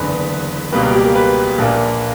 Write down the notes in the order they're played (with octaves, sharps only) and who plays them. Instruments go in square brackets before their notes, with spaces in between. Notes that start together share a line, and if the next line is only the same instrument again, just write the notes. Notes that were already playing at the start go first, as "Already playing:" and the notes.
Already playing: [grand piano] F#1 E2 D3 B4
C#2 B2 G3 A#3 B4
A#4
G4
A#4
B4
A#1 A#2 A#3